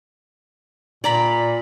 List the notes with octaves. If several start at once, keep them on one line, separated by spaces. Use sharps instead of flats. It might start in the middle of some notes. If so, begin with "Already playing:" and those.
A#2 D5 A#5 B5